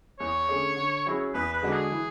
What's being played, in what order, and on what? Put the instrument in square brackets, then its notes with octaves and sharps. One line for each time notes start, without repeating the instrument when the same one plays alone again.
[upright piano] E2 [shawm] C#5
[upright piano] D3 A3 C#4 G#4
D3
F#3 C#4 E4 G#4
[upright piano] E2 [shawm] B4
[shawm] B4
[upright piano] D3 G#3 D4 F#4
[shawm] G#4
[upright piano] E3